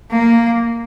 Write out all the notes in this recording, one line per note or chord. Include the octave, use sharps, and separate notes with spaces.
A#3